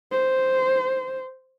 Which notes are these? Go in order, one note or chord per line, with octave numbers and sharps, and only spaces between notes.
C5